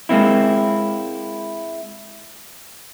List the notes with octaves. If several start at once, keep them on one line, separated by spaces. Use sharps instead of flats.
G#3 A#3 C4 E4